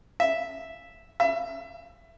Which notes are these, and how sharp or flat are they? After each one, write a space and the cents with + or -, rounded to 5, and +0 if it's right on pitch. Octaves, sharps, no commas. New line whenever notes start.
E5 -5
E5 +20